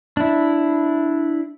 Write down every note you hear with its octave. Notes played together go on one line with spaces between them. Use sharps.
D4 E4